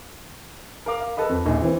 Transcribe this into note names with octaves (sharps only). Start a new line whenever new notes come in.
A#4 F5 D6
F5
A4 B4 D#5 B5
F2
D#1 A#1 D#4
E3 C4